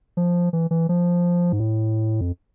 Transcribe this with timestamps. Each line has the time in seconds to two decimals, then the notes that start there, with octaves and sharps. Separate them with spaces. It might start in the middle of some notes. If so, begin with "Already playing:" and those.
0.17 F3
0.53 E3
0.71 E3
0.89 F3
1.52 G#2
1.60 A2
2.21 F2